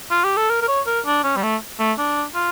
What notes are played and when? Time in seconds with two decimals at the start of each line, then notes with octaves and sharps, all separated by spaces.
0.11 F4
0.24 G4
0.37 A4
0.50 A#4
0.62 A#4
0.68 C#5
0.87 A#4
1.06 D4
1.24 C#4
1.37 G3
1.43 A3
1.79 A3
1.98 D4
2.35 F4